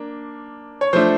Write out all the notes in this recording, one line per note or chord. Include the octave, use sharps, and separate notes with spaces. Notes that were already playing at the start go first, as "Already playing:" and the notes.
Already playing: A#3 D4
C#5
F3 A3 D4 C5